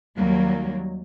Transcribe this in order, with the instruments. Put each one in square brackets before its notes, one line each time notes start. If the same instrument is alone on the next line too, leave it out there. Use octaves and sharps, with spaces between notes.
[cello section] D#2 F#3 G3 A#3